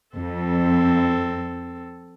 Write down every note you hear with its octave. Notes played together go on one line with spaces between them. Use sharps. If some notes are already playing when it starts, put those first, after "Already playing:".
F2 C4 A4